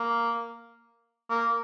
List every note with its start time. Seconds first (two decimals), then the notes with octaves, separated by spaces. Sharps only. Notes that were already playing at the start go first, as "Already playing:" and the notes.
Already playing: A#3
1.30 A#3